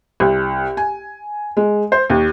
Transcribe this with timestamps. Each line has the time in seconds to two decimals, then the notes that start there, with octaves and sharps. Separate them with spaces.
0.20 C2
0.77 G#5
1.57 G#3
1.92 C5
2.10 D#2